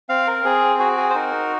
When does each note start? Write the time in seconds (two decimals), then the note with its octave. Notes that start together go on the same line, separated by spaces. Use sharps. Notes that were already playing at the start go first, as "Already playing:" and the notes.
0.09 C4 F5
0.27 A#4
0.45 C4 G#4
0.79 F#4 G#4
0.97 G#4
1.10 C5
1.15 D#4 A#4